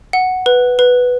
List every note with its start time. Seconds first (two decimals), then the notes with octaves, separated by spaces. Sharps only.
0.13 F#5
0.46 B4
0.79 B4